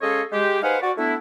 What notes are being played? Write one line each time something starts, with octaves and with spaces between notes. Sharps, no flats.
G#3 C#4 A4 C#5 D#5 F5
G#3 G4
D#4 B4 C5 F5 F#5 G#5
F#4 D5
A3 B3 D4 E4